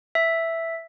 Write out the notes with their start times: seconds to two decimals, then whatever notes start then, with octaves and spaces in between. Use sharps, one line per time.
0.15 E5